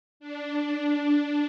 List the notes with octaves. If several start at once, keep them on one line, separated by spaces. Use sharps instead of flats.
D4